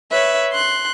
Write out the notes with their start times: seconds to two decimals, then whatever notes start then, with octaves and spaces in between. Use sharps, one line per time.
0.11 B4 C#5 E5
0.52 C6 F#6